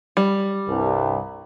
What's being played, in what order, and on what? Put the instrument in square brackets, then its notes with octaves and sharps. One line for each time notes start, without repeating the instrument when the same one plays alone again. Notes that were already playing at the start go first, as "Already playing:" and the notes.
[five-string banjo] G3
[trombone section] C2 G2